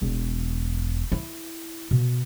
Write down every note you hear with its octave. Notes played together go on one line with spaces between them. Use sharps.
E1
E4
B2